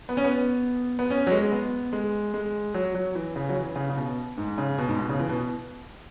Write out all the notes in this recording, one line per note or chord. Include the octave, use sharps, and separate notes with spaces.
B3
C#4
B3
B3
C#4
F#3
G#3
B3
G#3
G#3
F#3
F#3
E3
C#3
F#3
E3
C#3
C#3
B2
G#2
C#3
B2
G#2
B2
C#3
E3
B2